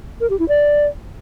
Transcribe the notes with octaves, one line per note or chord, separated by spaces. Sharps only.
A#4
G4
E4
D5